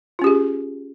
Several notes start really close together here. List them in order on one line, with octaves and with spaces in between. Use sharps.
F4 C#4 G4 G#4